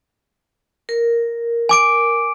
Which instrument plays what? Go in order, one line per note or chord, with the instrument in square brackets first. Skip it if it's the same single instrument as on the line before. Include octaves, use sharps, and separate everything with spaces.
[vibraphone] A#4
[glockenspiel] G#5 D6 D7